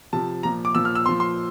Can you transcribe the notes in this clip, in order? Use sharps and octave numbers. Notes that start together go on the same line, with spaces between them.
C3 F3 A5
A#2 F3 A#5
D6
A#2 F3 E6
F6
E6
A#2 F3 C6
C6